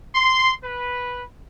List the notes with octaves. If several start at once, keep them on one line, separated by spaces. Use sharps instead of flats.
C6
B4